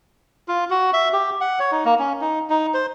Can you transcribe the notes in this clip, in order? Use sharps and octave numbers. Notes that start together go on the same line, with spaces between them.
F4
F#4
E5
G4
F#5
C#5
D#4
A#3
C#4
D#4
D#4
C5